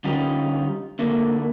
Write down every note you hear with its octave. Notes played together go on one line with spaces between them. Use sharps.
D3 G3 C#4 D#4 F4 G4
D3 A3 A#3